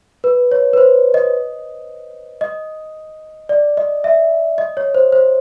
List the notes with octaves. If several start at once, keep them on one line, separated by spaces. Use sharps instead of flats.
B4
C#5
B4
C5
D#5
D#5
D5
D#5
E5
D#5
C#5
C5
C5